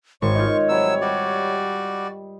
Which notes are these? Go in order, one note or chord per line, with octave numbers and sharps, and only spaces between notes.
G#1 C#5 C#6
F4 D#5 G6 G#6
C3 F#3 G3 E6
G3 F#4 D5 C#6